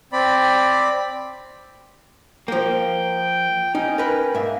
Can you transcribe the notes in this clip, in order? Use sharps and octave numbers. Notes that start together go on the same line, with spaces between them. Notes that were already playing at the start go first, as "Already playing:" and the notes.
C4 D5 B5
F3 A#3 G5
C#4 D#4
A#4 B4 G5
G#2 A#3 E5